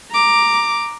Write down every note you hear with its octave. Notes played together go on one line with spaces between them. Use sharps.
A#5 D6